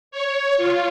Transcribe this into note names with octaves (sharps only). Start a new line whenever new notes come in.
C#5
F4